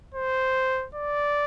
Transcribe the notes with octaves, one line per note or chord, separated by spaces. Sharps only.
C5
D5